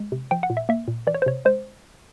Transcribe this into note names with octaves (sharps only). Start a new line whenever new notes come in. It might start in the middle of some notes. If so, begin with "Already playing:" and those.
Already playing: G#3
C3
F3 G5
F#5
A#2
E5
A#3 E5
A#2
E3 D5
C#5
C5
C3 C#5
G#3 C5